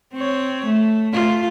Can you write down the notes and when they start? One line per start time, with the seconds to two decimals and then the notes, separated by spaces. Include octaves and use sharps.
0.13 C4 C#5
0.65 A3
1.13 A3 F4